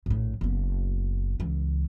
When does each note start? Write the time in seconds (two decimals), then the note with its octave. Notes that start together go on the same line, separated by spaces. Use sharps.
0.06 A#1 A2
0.41 F#1 B3
1.40 C#2 E3